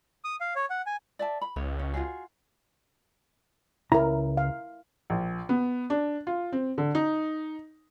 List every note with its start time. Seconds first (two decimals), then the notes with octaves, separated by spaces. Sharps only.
0.24 D#6
0.40 F5
0.56 C#5
0.70 F#5
0.86 G#5
1.19 D5 E5 A5
1.41 B5
1.56 C#2 C#5
1.79 C#4
1.94 F4 F#4 G#4
3.92 C#2 E4 A#4 A#5
4.37 F5
5.10 A#1
5.49 B3
5.90 D4
6.27 F4
6.52 C4
6.78 D3
6.95 D#4